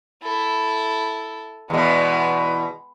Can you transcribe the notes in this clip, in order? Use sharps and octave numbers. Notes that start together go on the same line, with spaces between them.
E4 A4
E2 B2 G#3 B3